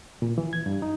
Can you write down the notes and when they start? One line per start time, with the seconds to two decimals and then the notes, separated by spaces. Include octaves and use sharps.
0.22 A#2
0.38 E3
0.53 G#6
0.66 G2
0.82 D#4